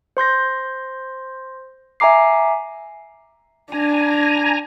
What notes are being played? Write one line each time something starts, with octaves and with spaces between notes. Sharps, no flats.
C5 C6 G6 A#6
E5 G#5 A#5 D6 C7
D4 G#5 A#5